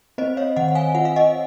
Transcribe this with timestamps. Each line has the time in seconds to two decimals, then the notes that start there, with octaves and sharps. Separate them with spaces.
0.18 C4 C5 D#5
0.37 C#5 F5
0.56 D#3 D#5 F#5
0.68 F#5
0.75 F5 G#5
0.95 F4 F#5
1.05 F5
1.16 D#5 F#5